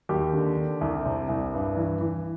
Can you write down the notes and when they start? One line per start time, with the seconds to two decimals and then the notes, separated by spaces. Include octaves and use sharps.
0.09 D#2 G4
0.33 D3
0.57 D3
0.81 C2
1.06 C3
1.29 C2
1.54 G2
1.77 E3
2.01 E3